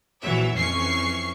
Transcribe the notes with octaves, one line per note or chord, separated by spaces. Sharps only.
A#1 E3 F#3 E5
F2 E3 C#4 C#6 C7